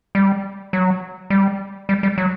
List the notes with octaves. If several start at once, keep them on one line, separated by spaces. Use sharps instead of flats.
G3
F#3
G3
G3
G3
F#3